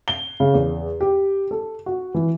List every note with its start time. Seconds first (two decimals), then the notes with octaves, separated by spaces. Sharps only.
0.08 G7
0.40 C#3
0.54 E2
1.01 G4
1.51 A4
1.86 F#4
2.14 E3